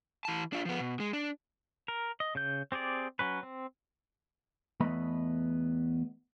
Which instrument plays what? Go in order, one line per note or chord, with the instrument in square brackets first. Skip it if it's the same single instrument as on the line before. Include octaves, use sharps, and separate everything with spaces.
[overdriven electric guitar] E3 A5
D4 F4
F3 B3
B2
G#3
D4
[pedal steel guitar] A#4
D#5
C#3 G6
C4 G4 G#4 D5
F#3 C#4 B4
C4
[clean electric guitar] E2 A3 B3 D#5 B5